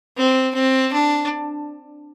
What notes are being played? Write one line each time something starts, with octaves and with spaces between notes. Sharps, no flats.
C4
C4
D4